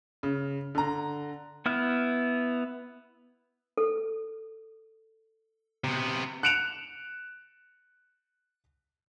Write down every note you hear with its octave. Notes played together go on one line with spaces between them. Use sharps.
C#3
D3 A#5
B3 E4 F6
A4
C3 B3
F#6 C#7 D7 E7 F7